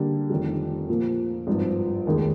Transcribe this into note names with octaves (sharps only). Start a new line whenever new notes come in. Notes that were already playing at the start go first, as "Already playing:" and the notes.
Already playing: D3 G3 A#3 D4 G4
F1 F2 D#3 G3
A#2 F3 A#3
G#1 G2 F3
F1 D#2 D#3 G#3 D#4